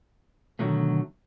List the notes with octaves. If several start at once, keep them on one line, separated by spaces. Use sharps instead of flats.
B2 D3 D#3 F#3 G#3 A3